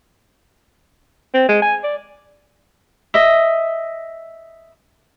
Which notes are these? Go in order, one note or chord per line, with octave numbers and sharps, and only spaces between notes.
C4
G#3
G#5
D5
D#5 E5